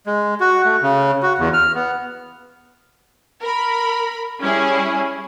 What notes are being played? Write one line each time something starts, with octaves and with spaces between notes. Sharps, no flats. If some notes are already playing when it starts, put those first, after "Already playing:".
G#3
F#4
A3
C#3
F#4
E2
F6
B3
A#4 B5
G3 C#4 E4 G#4